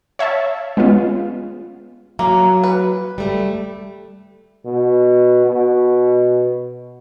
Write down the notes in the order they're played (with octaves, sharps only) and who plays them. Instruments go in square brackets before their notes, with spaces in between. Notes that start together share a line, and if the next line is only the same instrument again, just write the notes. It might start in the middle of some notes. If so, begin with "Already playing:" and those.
[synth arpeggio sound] C#5 E5 F5 A5
G#3 B3 C#4 F4
[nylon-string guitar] F#3 [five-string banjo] A#3
[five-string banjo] B4
[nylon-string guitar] G3 A3
[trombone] B2
B2